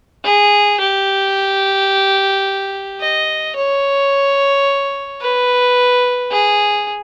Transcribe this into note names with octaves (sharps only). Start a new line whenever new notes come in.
G#4
G4
D#5
C#5
B4
G#4